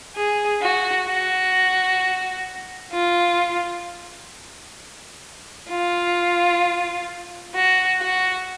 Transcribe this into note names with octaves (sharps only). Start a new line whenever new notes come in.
G#4
F#4
F#4
F4
F4
F#4
F#4